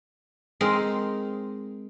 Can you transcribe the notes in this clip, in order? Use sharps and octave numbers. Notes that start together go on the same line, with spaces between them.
G#3 C4 D#4 A#4